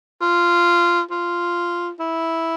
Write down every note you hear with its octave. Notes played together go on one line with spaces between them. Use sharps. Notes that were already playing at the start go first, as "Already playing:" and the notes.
F4
F4
E4